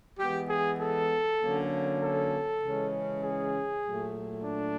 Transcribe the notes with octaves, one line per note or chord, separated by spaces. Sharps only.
E3 G#3 B3 G4
G#4
A4
D3 F#3 A#3 C#4
A4
C#3 E3 G#3 C#4
G#4
A#2 F#3 A3
D4